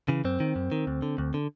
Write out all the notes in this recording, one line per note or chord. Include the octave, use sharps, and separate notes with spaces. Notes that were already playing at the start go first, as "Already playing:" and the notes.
C#3 E3
F#2 C4
D#3
F#2
D#3
D2
D3
D2
D3